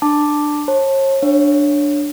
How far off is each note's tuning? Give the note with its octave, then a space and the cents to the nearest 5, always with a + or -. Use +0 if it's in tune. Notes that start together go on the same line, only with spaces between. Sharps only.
D4 +15 A5 +0 D6 +0
C#5 -40 A5 +0
D4 +0 C#5 +0 F5 +0